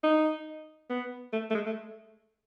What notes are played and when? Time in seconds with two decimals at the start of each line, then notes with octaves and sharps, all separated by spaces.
0.03 D#4
0.90 B3
1.33 A3
1.50 A3
1.55 G#3
1.66 A3